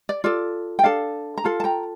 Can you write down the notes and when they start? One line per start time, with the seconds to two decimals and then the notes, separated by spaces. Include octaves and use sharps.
0.09 D5
0.24 F4 A4 D5
0.79 G5
0.84 D4 A4 F5 A5
1.38 A#5
1.44 F4 A4 F5 A5
1.60 A5
1.64 G5 A#5